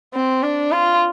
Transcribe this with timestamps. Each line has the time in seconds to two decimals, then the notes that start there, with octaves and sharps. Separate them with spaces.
0.14 C4
0.42 D4
0.71 F4